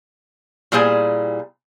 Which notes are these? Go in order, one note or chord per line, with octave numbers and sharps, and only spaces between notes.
A#2 G3 E4 G#4 C5 G#5